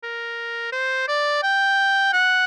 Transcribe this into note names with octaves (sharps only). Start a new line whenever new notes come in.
A#4
C5
D5
G5
F#5